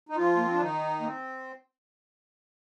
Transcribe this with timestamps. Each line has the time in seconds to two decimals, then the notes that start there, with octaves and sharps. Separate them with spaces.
0.09 D#4
0.16 F3 F4
0.37 A#3
0.44 C4
0.52 D4
0.61 D#3 D#4
1.01 A#3
1.05 C4